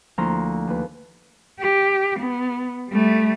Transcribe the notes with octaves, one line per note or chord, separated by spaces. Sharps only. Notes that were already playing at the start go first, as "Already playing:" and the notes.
D2 F3 A#3 E4 A#5 C6
D#2 B4
G4
B3
G3 A3